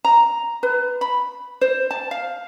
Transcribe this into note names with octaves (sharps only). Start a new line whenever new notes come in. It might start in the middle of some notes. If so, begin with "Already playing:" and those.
A#5
B4
B5
C5
A5
F5